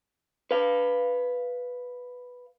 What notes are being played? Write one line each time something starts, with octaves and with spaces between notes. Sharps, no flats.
B4 F5